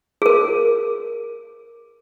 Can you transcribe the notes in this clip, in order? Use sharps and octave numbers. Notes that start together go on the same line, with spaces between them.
G#4 A#4